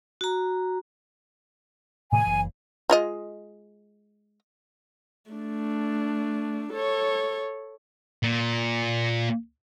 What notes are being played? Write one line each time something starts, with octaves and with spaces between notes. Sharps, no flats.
F#4 A#5
A2 C3 D#3 G#5
F#1 E3
G#3 F4 D#5
A3 D4
A4 C#5
A#2